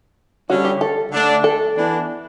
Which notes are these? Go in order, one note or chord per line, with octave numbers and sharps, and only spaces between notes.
D3 G3 C#4 F#4
G4
A4
D3 A3 D4
A4
E3 B3 D4